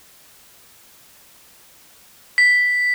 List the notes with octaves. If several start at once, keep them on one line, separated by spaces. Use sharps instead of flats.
B6